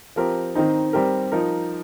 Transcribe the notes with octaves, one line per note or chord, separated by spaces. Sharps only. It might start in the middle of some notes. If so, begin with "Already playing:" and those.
F3 C4 G4 A#4
D#3 C4 D#4
G3 C4 G4 A#4
F3 D#4 A#4